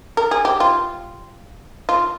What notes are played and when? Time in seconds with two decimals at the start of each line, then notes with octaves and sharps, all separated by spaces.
0.17 A#4
0.31 G#4
0.45 G4
0.60 F4
1.89 F4